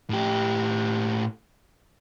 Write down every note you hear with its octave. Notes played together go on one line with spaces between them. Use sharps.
A2 G4